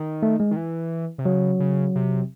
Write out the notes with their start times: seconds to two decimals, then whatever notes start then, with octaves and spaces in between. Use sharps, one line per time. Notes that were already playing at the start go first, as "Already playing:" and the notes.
Already playing: D#3
0.23 A3
0.40 G#3
0.51 D#3
0.57 E3
1.18 C3
1.25 C#3 F#3
1.60 C#3
1.95 C3